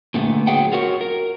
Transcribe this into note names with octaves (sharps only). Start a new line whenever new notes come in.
A#2 D3 A3 B3
F#3 G#4 B4 F#5 G5
F4 F#4 A#4 C#5
A#4